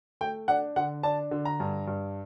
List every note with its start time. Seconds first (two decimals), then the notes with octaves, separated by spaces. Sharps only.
0.21 A3 G5
0.48 D4 F#5
0.76 D3 F#5
1.03 D4 A5
1.31 D3
1.45 A#5
1.60 G2
1.87 G2